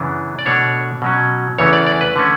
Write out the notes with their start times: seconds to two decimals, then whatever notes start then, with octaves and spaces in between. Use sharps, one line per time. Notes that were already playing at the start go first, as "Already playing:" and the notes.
Already playing: F#2 C#3 E3 B3 D4
0.39 D5
0.46 B2 A3 D4 C#5
1.02 B2 F#3 C#4
1.58 E2 C#3 E3 A3 C#4 C#5
1.73 D5
1.87 D5
2.01 B4
2.16 D3 A3 C#4